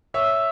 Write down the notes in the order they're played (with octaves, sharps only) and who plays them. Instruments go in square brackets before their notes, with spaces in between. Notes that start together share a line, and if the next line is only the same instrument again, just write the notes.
[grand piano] C#5 E5 [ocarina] E6